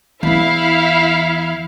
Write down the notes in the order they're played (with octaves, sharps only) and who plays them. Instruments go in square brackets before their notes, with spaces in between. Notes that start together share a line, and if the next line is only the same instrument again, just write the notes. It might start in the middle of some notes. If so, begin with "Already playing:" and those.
[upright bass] E2 E3 [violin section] E4 E5 F5